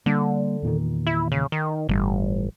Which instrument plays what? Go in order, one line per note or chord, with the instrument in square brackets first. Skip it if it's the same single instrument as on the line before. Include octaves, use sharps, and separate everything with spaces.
[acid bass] D3 [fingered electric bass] G3 A#3
[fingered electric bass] E2 A#2 D#3
[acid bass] E4
C#3
D#3
[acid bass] G1 [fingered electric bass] A2 E3 G3